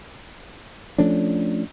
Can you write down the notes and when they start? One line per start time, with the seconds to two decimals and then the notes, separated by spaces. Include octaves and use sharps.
0.98 F3 A3 C#4 D4